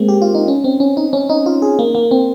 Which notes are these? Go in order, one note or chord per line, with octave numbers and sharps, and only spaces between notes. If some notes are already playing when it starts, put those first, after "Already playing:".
Already playing: G#3 A#3 C4
G4
F4
D#4
C#4
C4
C#4
D#4
C#4
D#4
F4
G#4
A#3
A#3
C4